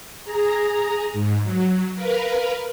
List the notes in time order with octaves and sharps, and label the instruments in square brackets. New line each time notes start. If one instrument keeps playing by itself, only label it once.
[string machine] G#4 A#5
G#2
F#3
A#4 B4 F5